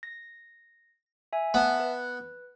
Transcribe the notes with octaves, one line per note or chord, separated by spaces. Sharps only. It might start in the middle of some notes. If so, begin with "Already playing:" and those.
A#6
E5 G#5
B3 E5 A5
B4